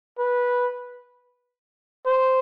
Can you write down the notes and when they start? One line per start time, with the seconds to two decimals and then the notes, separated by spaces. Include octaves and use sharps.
0.19 B4
2.06 C5